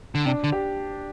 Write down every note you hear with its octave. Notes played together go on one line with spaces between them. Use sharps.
D3
C3 D4
D3
G4